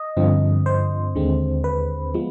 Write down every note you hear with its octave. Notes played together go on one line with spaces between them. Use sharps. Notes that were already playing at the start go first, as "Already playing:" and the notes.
Already playing: D#5
G2 D3 F3 C4
C5
D#2 D3 G#3 C4
B4
F3 G#3 B3